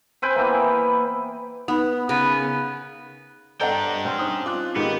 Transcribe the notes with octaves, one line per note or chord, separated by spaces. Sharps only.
C4 B4 G5 G#5
E3 A#3 B3 E4
B3 D#4 B5
C#3 B3 A#4
D4 A4 C5 D5 D#5 F#5 G5 A#5
C4 C#4
D#4 C5 D#6
F4 D6 F#6
G#2 D#3 B3 G4